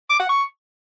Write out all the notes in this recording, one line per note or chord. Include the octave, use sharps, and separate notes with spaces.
D6
F#5
C#6